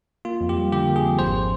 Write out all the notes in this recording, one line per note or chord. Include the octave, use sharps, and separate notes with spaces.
A#3 F4
F2
G4
G3
D3 G4
A#3
G#4
F2
G#1 C5